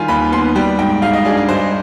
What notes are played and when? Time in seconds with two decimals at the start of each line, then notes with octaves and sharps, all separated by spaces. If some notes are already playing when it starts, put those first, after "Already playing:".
Already playing: D#3 G3 F4 G#5
0.08 D#2 B5
0.32 B3 C6
0.55 G3 G5
0.79 G#2 G5
1.02 G#2 F5
1.14 D#5
1.25 D4 G#4
1.37 G#4
1.49 G2 C5